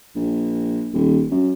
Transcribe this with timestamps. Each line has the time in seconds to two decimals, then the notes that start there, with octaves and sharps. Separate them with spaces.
0.15 A#1
0.93 D#1
1.31 F#2